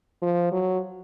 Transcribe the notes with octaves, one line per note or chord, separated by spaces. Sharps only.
F3
F#3